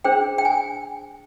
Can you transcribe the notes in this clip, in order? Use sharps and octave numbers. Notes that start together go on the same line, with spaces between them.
D4 G#4 C5 G5
G5
G#5